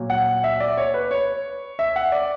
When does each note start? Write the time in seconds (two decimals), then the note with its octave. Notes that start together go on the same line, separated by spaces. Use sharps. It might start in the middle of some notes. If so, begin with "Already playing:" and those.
Already playing: A#2 F#3
0.10 F#5
0.44 E5
0.60 D5
0.77 C#5
0.94 B4
1.11 C#5
1.79 E5
1.96 F#5
2.12 D5